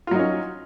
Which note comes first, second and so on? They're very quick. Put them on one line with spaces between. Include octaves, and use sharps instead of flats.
F4 F#3 D#4 C#4